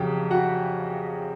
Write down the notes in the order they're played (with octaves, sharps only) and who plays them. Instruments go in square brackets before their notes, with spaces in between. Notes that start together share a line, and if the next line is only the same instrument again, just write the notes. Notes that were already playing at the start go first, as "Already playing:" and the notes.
Already playing: [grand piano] F2 C#3 F#3 G4 G5
F#4 F#5